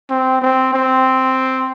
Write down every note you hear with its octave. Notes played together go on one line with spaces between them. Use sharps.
C4
C4
C4